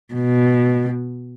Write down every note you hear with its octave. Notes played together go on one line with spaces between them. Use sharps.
B2